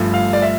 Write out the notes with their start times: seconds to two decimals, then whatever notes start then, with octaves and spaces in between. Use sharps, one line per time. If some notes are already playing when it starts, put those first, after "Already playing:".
Already playing: G1 G2 F3 A3
0.14 F5
0.33 D5
0.42 E5